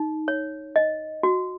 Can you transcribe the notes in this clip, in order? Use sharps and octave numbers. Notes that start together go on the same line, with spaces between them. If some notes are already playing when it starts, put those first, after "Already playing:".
Already playing: D#4
C#5
D#5
F#4